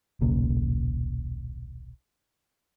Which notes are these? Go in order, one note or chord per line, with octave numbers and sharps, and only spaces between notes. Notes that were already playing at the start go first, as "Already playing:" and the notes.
D#1 B1 C#3 A#3